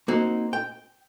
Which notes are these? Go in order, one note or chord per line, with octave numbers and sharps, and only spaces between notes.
A#3 C4 D#4 F#4
G5